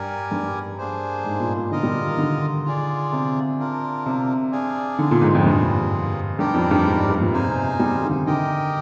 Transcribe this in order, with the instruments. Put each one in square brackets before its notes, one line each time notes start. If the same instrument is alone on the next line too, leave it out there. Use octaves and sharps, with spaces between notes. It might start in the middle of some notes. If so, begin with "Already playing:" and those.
Already playing: [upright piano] G2 [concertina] G4 A#4 D5 G#5
[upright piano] G2
[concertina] A#3 D4 G#4 C5
[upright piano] G#2
A#2
A#2
[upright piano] D3 [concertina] F4 A#4 D#5
[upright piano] G3
D#3
D3
[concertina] F4 G#4 D5
[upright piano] C3
[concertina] D4 F4 A#4
[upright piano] C3
[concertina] D4 G#4 D5 F5 G#5
[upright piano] D3
A#2
G#2
F2
[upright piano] G2 [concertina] A#3 F4 G#4
[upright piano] G2 [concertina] D4 G4 A#4 D5 G5
[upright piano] F2
G2
G#2
G2
A#2
[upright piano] C3 [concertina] D#4 G#4 C5 F5 G#5
[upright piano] C3
C3
G3
D#3
D3
C3
[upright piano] D3 [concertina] G4 A#4 D#5 G5